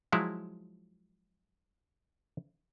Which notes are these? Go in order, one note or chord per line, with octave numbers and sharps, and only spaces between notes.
F3 F#3 G#3 E4